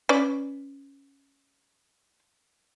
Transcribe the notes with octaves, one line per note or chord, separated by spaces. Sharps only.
C#4 B4 D5